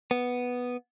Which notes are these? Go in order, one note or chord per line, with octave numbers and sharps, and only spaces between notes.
B3